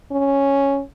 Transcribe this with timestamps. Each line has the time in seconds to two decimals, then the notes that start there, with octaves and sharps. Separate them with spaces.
0.11 C#4